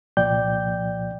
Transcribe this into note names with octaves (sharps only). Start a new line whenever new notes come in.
C2 A#2 F3 D5 G5 G6